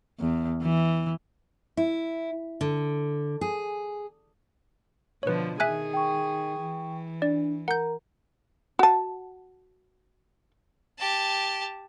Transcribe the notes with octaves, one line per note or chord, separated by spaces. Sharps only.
E2
E3
E4
D3
G#4
B2 D3 F3 B4 C#5
D#3 G#4 E5 G#5 F#6
G5 C#6
E3
D4 D5
A#4 F#5 A#5 G6
F#4 A5
G4 A5